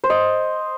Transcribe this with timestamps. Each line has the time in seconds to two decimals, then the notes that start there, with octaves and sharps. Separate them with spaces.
0.04 C5
0.10 D#5